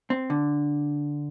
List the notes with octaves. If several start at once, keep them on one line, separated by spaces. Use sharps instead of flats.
C4
D3